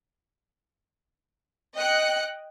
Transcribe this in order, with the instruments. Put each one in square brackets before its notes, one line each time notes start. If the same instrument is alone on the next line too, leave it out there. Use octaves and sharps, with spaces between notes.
[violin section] D#5 G5 F#6 C#7